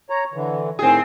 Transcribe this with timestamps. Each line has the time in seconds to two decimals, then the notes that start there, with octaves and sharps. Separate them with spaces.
0.10 C#5 A#5
0.34 D3 E3
0.79 A2 D#3 C4 G#4